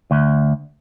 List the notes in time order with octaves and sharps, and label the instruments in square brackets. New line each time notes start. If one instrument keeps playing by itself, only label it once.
[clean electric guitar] D2